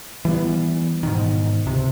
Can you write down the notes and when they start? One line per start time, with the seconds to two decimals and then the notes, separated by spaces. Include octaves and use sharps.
0.25 E3 G3 B3
1.03 G#2 B2 D#3
1.66 C#2 C3